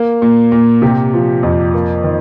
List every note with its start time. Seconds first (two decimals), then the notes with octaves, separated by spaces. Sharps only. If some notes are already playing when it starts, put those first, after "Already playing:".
Already playing: A#3
0.22 A#2
0.52 A#2
0.82 C3 G4
1.13 F3
1.43 F2
1.74 A#3
2.04 D#3